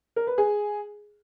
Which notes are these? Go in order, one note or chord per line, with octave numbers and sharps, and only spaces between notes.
A#4
B4
G#4